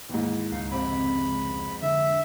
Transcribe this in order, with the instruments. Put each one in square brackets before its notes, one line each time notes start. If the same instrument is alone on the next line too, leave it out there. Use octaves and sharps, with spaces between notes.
[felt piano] D#2 G#2 [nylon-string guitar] E3
[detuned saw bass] C#2 [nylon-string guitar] D#4 F5
[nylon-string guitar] F2 C3 C4 [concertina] B5
[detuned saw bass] D3 [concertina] E5